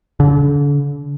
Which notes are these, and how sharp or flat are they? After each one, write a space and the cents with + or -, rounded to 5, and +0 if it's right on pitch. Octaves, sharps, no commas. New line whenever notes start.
D3 -40